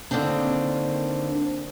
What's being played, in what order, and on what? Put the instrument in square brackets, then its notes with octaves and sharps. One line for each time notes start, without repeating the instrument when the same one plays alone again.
[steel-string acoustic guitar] D3 D#3 A#3 C4 D4